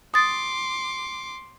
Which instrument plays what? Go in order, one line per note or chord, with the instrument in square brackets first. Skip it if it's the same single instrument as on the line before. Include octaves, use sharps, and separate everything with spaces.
[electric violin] C6 D6 [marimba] D#6 A6